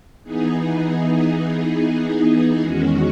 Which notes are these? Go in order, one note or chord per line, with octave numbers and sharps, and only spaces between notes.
E3 B3 D#4 G#4
E2 D#3 G#3 C#4 F#4